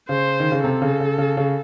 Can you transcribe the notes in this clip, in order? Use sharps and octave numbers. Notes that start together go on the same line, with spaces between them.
C#3 C5
D#3
C#3
C3 A4
C#3
C#3
C#3
C#3